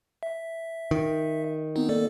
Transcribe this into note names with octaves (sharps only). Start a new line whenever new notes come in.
E5
D#3
B3 C4 D#4
A#3 A4 D5